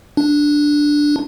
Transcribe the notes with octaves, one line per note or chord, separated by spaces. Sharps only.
D4